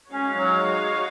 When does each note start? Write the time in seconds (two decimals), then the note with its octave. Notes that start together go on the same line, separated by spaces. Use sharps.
0.11 G#3 C#4 D#4 F#4 C#5 F5
0.35 F#3